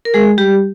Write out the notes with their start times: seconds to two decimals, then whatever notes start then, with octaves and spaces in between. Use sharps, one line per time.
0.05 A#4
0.14 G#3 G#4
0.38 G3 G4